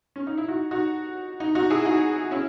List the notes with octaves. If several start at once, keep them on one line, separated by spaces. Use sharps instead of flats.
C#4
D#4
E4
D#4 F#4
D#4 F#4
D#4
D#4 F#4
E4 G#4
D#4 F#4
C#4 E4